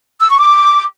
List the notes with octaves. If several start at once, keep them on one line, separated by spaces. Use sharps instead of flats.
E6
C#6
D6